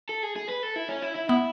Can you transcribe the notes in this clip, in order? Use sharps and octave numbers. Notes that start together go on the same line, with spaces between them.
A4
G#4
G#4
B4
A4
E4
C#4
E4
E4
B3 E4